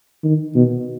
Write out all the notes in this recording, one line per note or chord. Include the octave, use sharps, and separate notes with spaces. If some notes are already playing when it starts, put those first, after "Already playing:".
D#3
B2